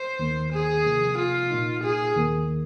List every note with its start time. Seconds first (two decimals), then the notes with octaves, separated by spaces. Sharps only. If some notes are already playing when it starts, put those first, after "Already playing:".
Already playing: C5
0.19 D#2 D#3 A#3
0.52 G#4
0.84 C3 F3 A#3
1.18 F4
1.51 A#2 A#3 D#4
1.84 G#4
2.16 D#2 D#3 A#3